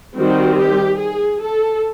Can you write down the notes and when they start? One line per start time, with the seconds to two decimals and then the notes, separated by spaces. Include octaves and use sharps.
0.16 D#3 G3 C4 F#4
0.58 G4
0.99 G#4
1.41 A4